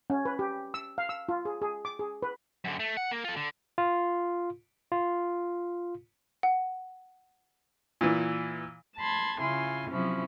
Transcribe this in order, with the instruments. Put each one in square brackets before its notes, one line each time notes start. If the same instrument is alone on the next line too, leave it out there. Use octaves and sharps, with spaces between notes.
[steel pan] C#4
B4
G4
E6
F5
E6
F4
G#4
G#4
D6
G#4
B4
[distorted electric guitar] F#2 D3
A3
F#5
A#3
F4 A4
D3
[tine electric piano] F4
F4
[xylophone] F#5
[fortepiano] A#2 E3
[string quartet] A5 B5 C6 G#6
C#3 E4 F4 G#5 C6
C3 F3 F#3 C#4 E4